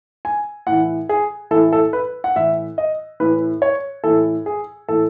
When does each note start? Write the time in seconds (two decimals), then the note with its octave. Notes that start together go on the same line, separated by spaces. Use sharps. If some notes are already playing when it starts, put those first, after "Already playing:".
0.25 G#5
0.67 A2 F#5
0.72 E3
1.09 G#4
1.51 E3 A4
1.55 A2
1.73 A4
1.93 B4
2.24 F#5
2.35 A2 E3 E5
2.78 D#5
3.20 A2 E3 B4
3.62 C#5
4.04 A2 E3 A4
4.46 G#4
4.88 A2 E3 A4